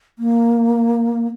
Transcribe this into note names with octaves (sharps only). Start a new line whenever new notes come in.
A#3